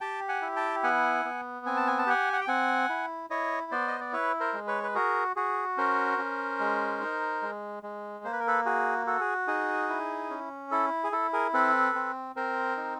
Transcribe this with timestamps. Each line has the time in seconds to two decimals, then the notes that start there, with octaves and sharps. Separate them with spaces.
0.01 G4 G5 A5
0.28 F#5 G#5
0.42 E4
0.56 G5 A5
0.83 B3 F#5 G#5
1.25 B3
1.66 C4 G#5
1.77 A5
1.87 G#5
1.99 A5
2.07 G4 F#5 G#5
2.33 F#5
2.41 G5
2.48 C4 F#5 G#5
2.89 E4
3.30 E4 C#5 D#5
3.71 B3 C5 D5
3.88 D#5
4.00 D5
4.13 E4 B4 C#5
4.40 A#4 C5
4.53 G#3
4.67 B4 C#5
4.83 B4
4.95 F#4 G#4 A#4
5.36 F#4 G#4
5.77 C#4 A#4 C5
6.18 C#4
6.60 G#3
7.01 D#4
7.42 G#3
7.83 G#3
8.24 A#3 C5
8.32 B4
8.40 A#4
8.47 A4 B4
8.66 F#4 G#4
9.07 F#4 A4
9.20 G#4
9.48 D#4 G#4
9.89 E4
10.30 C#4
10.71 E4 A4
11.04 G#4
11.12 E4 A4
11.33 G#4 A#4
11.53 C4 A4 B4
11.95 C4
12.36 C4 A#4 C5
12.77 D#4